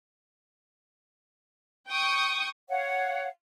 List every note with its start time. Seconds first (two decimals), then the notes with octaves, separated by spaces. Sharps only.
1.89 G5 C#6 D#6
2.68 C#5 F5 F#5